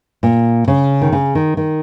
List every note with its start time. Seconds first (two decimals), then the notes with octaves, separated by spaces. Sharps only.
0.23 A#2
0.68 C#3
1.01 D#3
1.12 C#3
1.35 D#3
1.57 D#3